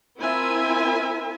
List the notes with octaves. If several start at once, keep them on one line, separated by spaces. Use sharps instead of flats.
C4 E4 F4 A#4 E5 G#5